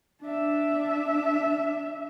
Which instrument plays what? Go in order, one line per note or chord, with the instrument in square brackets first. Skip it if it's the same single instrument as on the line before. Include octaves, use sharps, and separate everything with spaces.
[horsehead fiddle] D4 E5